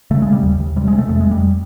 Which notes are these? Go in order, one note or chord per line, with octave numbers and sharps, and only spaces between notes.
C#3 A3
G#3
C#3
G3
D#2
D#2
C3 G3
G#3
C3
A3
F2 A3
G#3
F2
G3